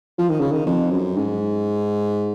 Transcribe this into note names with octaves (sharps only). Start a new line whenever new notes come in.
F3
D#3
C#3
D#3
F2
F#2
G#2